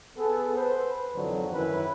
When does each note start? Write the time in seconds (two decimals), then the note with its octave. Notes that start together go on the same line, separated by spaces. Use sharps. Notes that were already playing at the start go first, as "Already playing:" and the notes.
0.17 B3 G#4 A4
0.55 B4 C5
1.16 F2 G#2 D3 E3 F#3
1.53 F#2 D#3 C#4 E4 B4